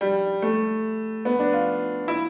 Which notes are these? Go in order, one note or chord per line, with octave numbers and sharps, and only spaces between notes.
G3
A3
B3
D4
F4
E4